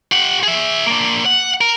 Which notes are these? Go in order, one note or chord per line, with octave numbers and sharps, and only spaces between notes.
G4 F#5
G#4 E5
A#3 D4
F#5
A#4